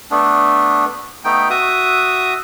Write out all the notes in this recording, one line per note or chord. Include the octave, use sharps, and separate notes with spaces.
A3 B3 D4
A3 B3 D#4 G5
F#4 E5 D#6